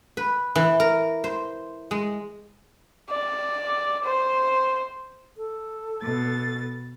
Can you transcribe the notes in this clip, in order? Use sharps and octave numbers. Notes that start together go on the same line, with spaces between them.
B4
E3
A#4
C5
G#3
D5
C5
A4
B2 A6